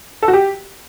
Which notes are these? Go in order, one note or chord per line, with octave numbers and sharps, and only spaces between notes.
A4
F#4
G4